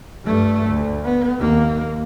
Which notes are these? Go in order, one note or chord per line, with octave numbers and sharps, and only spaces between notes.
G2 A3
D2
B3
D#2 A#3